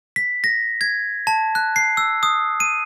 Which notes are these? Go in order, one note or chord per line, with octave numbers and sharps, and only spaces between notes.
B6
A#6
G#6
A5
F#6
C7
E6
D#6
D#7